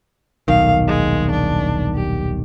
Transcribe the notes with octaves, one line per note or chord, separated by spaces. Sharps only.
D#1 B1 D#3 F5
G#3
D4
G4